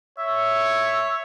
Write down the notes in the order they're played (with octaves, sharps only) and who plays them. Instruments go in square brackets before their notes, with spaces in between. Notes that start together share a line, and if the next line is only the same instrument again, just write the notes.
[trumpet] C#5 [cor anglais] E5